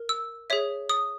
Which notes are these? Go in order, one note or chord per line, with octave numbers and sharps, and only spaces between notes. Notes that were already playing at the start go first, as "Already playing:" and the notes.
Already playing: A#4
E6
G#4 C#5 E5
D#6